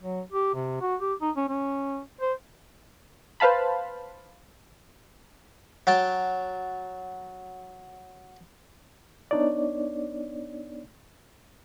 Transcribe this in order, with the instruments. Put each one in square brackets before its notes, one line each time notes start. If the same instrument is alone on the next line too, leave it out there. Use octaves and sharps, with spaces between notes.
[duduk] F#3
G4
C3
F#4
G4
D#4
C#4
C#4
C5
[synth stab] B4 C5 F5 A5 B5
[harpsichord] F#3 G5 A5
[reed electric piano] B3 D4 D#4 C#5 D5